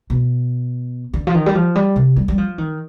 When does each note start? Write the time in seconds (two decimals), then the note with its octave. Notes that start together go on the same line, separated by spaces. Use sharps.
0.10 B2
1.14 D3
1.27 F3
1.34 D#3
1.46 G3
1.55 F3
1.75 G3
1.96 C3
2.16 G3
2.28 G3
2.38 F3
2.58 D#3